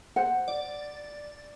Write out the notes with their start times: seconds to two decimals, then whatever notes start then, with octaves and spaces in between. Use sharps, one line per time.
0.16 C5 F#5
0.48 D5